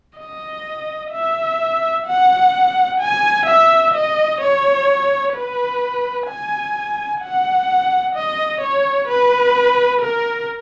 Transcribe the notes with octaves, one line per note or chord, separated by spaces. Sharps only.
D#5
E5
F#5
G#5
E5
D#5
C#5
B4
G#5
F#5
D#5
C#5
B4
A#4